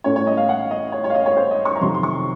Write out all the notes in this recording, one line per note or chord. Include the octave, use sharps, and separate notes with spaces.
A2 A3 C#4 C#5
C#5
D#5
F5
F#5
D#5
C#5
C#5
F5
D#5
C#5
C5
D#5
C#6
A#5
F2 C3 D#3 F#3 C6
C6
C#6